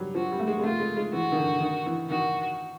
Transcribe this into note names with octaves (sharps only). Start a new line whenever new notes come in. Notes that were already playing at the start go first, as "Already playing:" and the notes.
Already playing: F#3 G3
F3 F#4
G3
A3
G#3
G#3
A3 F4
G#3
G#3
E3 F#4
D#3
D3
D#3
E3
D#3 F#4